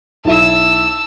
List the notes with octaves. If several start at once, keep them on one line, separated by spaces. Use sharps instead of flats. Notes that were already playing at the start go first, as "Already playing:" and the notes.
B1 E4 A5 E6